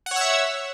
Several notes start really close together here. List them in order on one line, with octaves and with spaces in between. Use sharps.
F#5 C#5 E6 E5